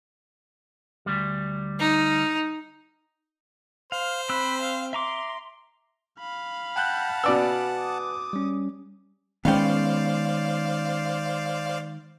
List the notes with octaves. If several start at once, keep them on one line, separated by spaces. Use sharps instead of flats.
D2 G3
D#4
C5 F5
C4 B5 E6 F#6
F5
E5 A#5 C6 D6
F5 B5
F#5 G5 A5 F#6 G6
B2 B4 D5 G#5 E6
D6 D#6
G3 C#4
D#3 G#3 B3 C#4 C5 D5 F5 G5